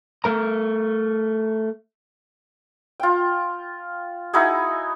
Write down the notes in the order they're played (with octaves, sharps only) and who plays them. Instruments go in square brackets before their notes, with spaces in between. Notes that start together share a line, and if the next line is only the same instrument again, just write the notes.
[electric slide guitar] A3 A#4 A#5
[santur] F4 G5
D#4 E4 F#4 G#4